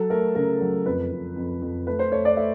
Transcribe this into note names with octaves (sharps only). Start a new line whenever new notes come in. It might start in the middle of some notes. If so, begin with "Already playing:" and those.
Already playing: F#3 A4
A3 A#4
C#3 A#4
F#3
F2 B4
F2
F2
F2
A3 B4
C5
A3 C#5
D5
A3 E5